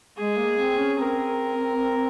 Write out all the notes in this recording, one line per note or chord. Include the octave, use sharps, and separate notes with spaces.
G#3 G#4
A#3
C4
C#4
C4 A#4